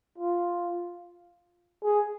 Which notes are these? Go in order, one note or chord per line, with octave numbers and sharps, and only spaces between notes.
F4
G#4